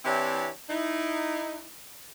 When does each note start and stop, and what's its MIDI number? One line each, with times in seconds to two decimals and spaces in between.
0.05 0.49 52
0.05 0.49 60
0.05 0.49 62
0.05 0.49 64
0.05 0.49 67
0.05 0.49 73
0.70 1.67 63
0.70 1.67 64